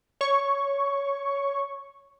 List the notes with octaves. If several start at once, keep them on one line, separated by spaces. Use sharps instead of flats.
C#5 C#6